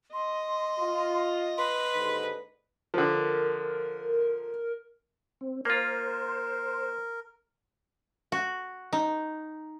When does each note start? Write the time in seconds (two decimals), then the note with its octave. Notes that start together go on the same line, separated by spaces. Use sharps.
0.13 D#5 C6
0.80 F4
1.58 B4 C6
1.96 D#2 G#2 D3
2.94 D3 F3 A#4
5.41 C4
5.65 A#3 F4 A#4 C5
8.32 F#4
8.93 D#4